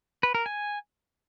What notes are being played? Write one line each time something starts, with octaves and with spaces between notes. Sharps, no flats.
B4
A#4
G#5